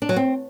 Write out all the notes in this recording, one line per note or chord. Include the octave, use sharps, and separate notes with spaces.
D4
F#3
C4